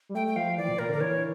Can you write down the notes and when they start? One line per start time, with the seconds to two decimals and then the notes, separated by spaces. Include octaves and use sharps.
0.09 G3
0.15 A3 G5
0.27 G5
0.36 F3 F5
0.57 E3 D5
0.68 A#2
0.79 A#2 A#4
0.89 D3 A#4
1.00 E3 C#5